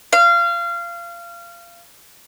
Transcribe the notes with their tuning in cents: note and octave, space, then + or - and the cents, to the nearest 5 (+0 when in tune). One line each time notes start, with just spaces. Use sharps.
F5 -25